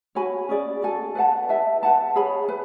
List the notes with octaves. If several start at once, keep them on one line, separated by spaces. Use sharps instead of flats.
F#4 C#5 G#5 B5
C#4 G#4 D5
F#4 A4 D5 G#5
B4 D5 F#5 A5
E4 B4 E5 A5
B4 F#5 A5
G#4 C#5 G#5 B5
B4